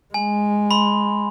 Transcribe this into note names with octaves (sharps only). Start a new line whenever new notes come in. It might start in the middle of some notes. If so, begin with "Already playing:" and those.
G#3 G#5
B5 C6